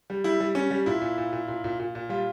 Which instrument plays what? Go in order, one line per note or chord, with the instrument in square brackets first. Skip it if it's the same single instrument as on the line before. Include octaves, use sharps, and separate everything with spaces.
[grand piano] G3
G3 E4
G3
G3 C#4
G3
A#2 E4
A#2
A#2
A#2
A#2
A#2
A#2
A#2
G3 F4